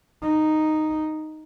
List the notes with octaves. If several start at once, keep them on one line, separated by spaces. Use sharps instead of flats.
D#4